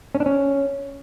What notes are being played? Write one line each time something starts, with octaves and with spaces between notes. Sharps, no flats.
C#4
D4
C#4